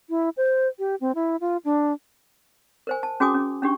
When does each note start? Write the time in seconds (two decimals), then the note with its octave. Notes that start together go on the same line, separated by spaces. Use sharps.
0.10 E4
0.37 C5
0.79 G4
1.01 C4
1.15 E4
1.41 F4
1.65 D4
2.87 A#4 C5 G#5
3.03 A5
3.20 C#4 F#4 G#4 G#5 D6 D#6
3.34 C#4
3.62 C#4 D4 G4 C#6